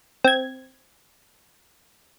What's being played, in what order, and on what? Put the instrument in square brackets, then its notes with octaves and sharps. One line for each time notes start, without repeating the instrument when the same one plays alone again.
[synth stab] C4 G#6